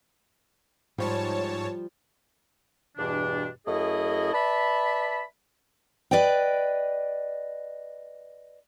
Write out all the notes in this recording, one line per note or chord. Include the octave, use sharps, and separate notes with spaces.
G#2 F3 G3 C#5 A5
E2 G2 B2 E3 D4
F#2 A3 E4 G#4 D#5
B4 D5 E5 A5 B5
B4 D5 D#5 G5